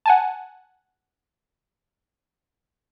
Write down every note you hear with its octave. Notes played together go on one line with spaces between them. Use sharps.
F#5 G#5 A5